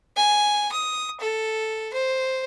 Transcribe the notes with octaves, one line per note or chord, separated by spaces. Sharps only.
G#5
D#6
A4
C5